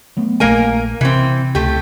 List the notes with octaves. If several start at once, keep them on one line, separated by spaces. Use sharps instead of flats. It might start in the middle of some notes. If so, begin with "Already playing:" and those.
F#3 A3 B3
A#1 A3 A#3 A#4 G#5
C3 E3 C4
C#2 A3 C4 G4